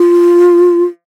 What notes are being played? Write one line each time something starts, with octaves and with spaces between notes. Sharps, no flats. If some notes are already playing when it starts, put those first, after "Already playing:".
Already playing: F4